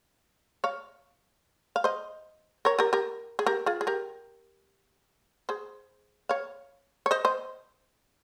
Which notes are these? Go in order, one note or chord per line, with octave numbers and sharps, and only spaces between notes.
C#5 F5
F5
C5 D#5
A#4 C#5
G4 A#4
G4 A#4
G#4
G4 A#4
F4 G#4
G#4
G4 A#4
G#4 C5
C#5 F5
C#5
C5 D#5
C5 D#5